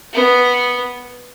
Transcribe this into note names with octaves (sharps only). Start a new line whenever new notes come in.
B3